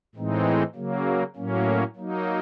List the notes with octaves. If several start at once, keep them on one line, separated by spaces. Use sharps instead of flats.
A2 E3 G#3 C4 D#4
C#3 F#3 A#3
A2 F#3 A#3 C#4
F#3 A#3 D#4